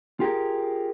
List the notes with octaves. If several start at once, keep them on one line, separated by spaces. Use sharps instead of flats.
F4 G4 G#4 A#4